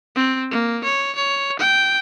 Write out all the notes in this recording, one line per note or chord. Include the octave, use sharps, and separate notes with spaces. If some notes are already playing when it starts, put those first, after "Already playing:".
C4
A#3
C#5
C#5
G5